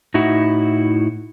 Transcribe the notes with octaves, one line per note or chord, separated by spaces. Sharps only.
A2 D#4 E4 F#4